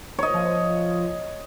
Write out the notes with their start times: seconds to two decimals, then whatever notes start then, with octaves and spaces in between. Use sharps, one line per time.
0.18 C#5 D#5
0.34 F3